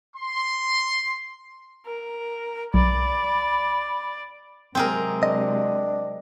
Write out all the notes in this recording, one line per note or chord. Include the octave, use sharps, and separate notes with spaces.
C6
A#4
B1 D5 B5
C3 F#3 G#3 C4 G#4 A#4
D4 D#5